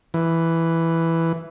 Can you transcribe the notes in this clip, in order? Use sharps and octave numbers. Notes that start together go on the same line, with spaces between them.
E3